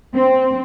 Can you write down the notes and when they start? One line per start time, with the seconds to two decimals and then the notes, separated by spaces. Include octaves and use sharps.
0.14 C4